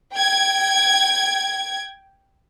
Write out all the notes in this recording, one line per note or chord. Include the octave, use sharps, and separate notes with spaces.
G5 G#6